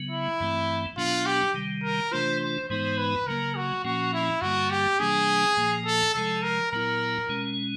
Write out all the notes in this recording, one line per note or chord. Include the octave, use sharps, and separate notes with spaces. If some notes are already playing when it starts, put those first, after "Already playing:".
Already playing: C#3 F#3 B3
E4
G2 E3 A3 C4
B2 F#3 B3 D4 F4
G4
C3 D#3 G3
A#4
C3 E3 A3 D4 F4 C5
C5
G#2 E3 G#3 B3 D#4 C5
B4
C#3 F#3 A#3 A#4
F#4
A#2 F3 A#3 C#4 F#4
E4
G2 D3 G3 A#3 F#4
G4
C3 E3 G3 A#3 D4 G#4
A#2 F3 A#3
A4
C3 F3 G#3 A4
A#4
A#2 F#3 B3 E4 A#4
B2 G#3 C#4